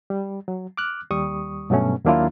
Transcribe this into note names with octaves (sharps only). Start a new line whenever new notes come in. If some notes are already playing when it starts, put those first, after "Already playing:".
G3
F#3
D6 F6 F#6
D#2 G3 C#6 D#6
G2 B2 F#3 A3 C#4
D#2 F#3 A#3 D4 E4 F4